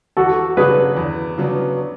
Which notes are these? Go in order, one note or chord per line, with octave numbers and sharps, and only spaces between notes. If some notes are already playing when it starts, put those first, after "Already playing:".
E2 F#4 A4
C#3 F#3 B3 D4 G#4 B4
E2
C#3 F#3 B3 D4